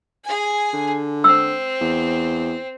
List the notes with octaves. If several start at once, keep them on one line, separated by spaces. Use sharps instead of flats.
G#4 G#5
D3
C4 E6
E2